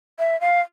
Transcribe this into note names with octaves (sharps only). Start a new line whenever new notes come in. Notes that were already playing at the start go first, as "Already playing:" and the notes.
E5
F5